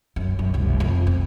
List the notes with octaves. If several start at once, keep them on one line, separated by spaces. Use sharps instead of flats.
F#2
F#2
F1 C2
F2
C4